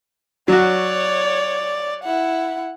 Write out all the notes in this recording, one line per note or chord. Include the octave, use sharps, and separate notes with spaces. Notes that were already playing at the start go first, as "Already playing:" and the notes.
F#3 F#4 C#5 D5
E4 F#5